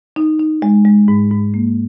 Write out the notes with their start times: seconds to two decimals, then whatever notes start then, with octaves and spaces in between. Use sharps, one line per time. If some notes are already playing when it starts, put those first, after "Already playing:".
0.16 D#4
0.39 D#4
0.62 G#3
0.85 G#3
1.08 G#2
1.31 G#2
1.54 A#3